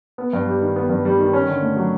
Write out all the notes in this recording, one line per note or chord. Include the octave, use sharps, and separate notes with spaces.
B3
G2
G3
D#3
B3
G2
G3
D#3
C#4
D3
A3
F#3